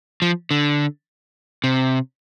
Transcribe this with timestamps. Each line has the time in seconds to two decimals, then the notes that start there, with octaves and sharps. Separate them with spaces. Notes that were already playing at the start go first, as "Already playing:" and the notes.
0.22 F3
0.51 D3
1.64 C3